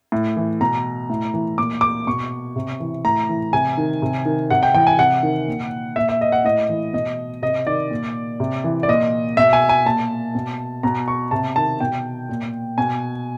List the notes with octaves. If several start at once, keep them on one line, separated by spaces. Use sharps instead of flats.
A2
E3
B2 A#5
A2
E3
A#2 D6
D6
B2 C#6
C3
E3
A2 A#5
E3
C3 G#5
D#3
C3
D#3
C3 F#5
G5
E3 G5
G#5
C3 F#5
D#3
A#2
A#2 E5
E5
D#5
F#5
A2 D#5
E3
B2 D#5
C3 D#5
D#3 D5
A#2
C3
E3
D5
A#2 D#5
B2 E5
G#5
G#5
A#2 A5
B2
B2 A#5
C#6
C3 A5
D#3 A5
B2 G5
A#2
B2 G#5